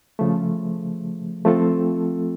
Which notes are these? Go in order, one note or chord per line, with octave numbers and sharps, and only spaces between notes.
C#3 F3 A3
F3 A3 C4 F4 A4